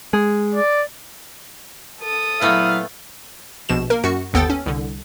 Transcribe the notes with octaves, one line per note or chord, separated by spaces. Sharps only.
G#3 G#4
D5
A4 D#6
A#2 F#3 A3 B3 E4 F5 B5
A#1 B2 E7
A#3 A#4
F#2 F#4 C#7
G1 D#2 B3 A4 G5 A6
C#4
C2 D3